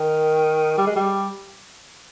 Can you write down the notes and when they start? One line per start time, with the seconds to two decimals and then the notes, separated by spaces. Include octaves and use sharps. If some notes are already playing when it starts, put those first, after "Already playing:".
Already playing: D#3
0.78 G3
0.87 G#3
0.96 G3